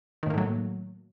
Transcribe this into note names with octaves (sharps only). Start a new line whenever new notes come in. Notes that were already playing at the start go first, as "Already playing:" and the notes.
A2 D#3 F#3 A3 A#3